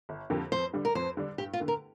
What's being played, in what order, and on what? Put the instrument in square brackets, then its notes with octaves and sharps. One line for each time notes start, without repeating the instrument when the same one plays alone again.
[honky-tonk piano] G1
F2 D3 A#3 G4
[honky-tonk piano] F2 [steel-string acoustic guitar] C5
[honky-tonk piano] D3 G3 D4
[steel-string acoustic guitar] A#4
[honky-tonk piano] F2 [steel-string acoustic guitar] C5
[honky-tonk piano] D3 G3 D4
[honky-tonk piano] G2 [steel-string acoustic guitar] G4
[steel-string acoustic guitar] F4
[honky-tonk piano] D3 A#3
[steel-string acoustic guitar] A#4